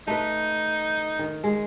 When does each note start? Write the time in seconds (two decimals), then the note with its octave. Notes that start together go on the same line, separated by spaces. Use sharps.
0.07 A3 D#4 B4
1.19 D#3
1.44 G#3